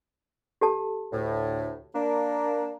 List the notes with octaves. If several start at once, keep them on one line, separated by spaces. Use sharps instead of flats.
G4 A4 A5
D2 A2
A#3 D4